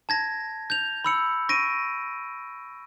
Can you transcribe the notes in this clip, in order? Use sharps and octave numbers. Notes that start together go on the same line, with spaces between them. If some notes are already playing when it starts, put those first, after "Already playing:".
A5 G#6 A#6
G6 F7
B5 E6 C#7
C#6 A#6 D7 D#7